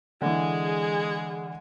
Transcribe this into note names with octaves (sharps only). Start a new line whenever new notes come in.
D3 E3 G#3 G#4